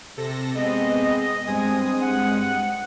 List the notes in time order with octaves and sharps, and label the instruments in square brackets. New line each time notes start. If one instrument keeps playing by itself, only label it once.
[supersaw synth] C3 A4 A#6
[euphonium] G#3 [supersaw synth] B3 C4 [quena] D#5
[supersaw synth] G2 G#3 D#6 [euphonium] C4 [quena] G#5
[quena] F#5